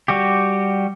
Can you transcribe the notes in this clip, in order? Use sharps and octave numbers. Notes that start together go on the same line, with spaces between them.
G3 F#4 G4